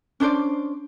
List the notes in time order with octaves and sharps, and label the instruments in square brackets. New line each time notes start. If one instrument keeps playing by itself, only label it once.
[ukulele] C#4 D4 C5 D5